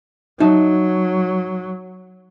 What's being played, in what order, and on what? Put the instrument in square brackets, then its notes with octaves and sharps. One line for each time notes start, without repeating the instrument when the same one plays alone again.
[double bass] F#3 [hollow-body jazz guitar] D#4 E5 A5